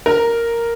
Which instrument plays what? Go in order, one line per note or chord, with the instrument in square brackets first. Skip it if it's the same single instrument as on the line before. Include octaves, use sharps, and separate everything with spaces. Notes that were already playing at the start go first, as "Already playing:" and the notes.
[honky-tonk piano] A#4